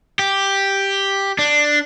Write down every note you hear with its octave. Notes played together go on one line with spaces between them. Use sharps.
G4
D4